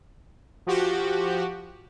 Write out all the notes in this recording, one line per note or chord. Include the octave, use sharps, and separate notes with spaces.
F3 F#4 G4